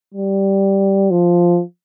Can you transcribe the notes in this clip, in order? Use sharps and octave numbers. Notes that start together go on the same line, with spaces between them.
G3
F3